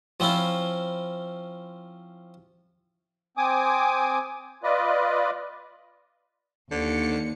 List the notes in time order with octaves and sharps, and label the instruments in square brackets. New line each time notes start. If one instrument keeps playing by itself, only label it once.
[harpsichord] F3 C4 C#4 E4 F4
[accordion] C4 G#5 D6 D#6
F4 B4 D5 D#5
[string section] D#2 C#7 [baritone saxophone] D3